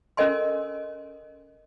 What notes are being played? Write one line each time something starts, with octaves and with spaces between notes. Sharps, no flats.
C#4 A4 A#4 D#5 G#5 C6